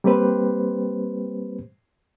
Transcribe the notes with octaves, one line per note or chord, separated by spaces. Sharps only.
G3 A#3 C4 G4 B4 C5